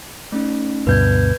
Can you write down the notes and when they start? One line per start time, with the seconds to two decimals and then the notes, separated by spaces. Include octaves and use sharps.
0.32 A3 C#4 D#4
0.87 D2 G2 B2 B4 G6 G#6